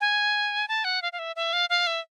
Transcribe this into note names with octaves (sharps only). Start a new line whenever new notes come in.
G#5
A5
F#5
F5
F5
E5
E5
F5
F5
E5